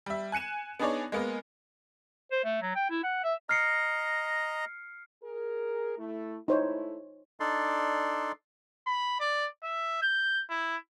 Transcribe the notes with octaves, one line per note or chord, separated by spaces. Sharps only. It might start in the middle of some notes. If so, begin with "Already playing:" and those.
G3 E5
G#5 F#6 C#7 D#7 E7
B3 D4 D#4 G#4 C#5 D5
G#3 A#3 B3 A#4
C5
A3
F#3
G5
E4
F#5
E5
D#5 A#5 F6 C7 C#7
G#4 A#4
A3 E4
A3 D#4 E4 C5 C#5
D4 D#4 A4 D5 C6
B5
D5
E5
G6
E4